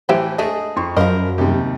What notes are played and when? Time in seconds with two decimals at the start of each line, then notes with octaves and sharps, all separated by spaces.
0.09 A2 E3 E4 G4 C5
0.38 G#3 A3 D4 G#4 D#5
0.76 F2 C6 C#6
0.97 F#2 F3 A#4 C5 D#5 B5
1.38 D#2 C3 G3 D#4 G4